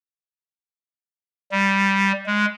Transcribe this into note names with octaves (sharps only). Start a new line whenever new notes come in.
G3
G#3